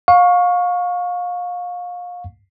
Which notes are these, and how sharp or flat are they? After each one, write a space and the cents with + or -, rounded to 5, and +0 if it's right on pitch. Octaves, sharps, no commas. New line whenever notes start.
F5 +30 C#6 +0